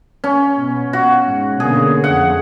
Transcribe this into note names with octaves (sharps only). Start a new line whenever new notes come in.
C#4
B2
F#4
G#2
B2 D3 A#3 G#4
F2 A3 F#5